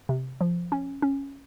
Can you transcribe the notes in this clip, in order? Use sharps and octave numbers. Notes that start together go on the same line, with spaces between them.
C3
F3
C#4
C#4